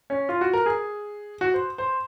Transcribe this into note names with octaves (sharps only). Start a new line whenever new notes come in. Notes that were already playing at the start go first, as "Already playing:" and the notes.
C#4
F4
F#4
A#4
G#4
F#4
C5
C5